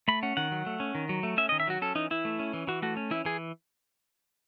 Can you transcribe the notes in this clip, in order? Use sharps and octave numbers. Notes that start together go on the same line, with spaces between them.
A3 B5
C#4 F#5
D#3 F#5
F#3
A3
C#4
D#3
F#3
A3
C#4 E5
D#5
D#3
E5
F#3 F#4
C#4 A4
E3 D#4
E3 E4
A3
C#4
E3
E3 F#4
A3 F#4
C#4
E3 E4
E3 G#4